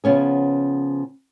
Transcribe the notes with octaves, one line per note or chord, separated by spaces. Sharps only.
C#3 F3 B3 C#4 G#4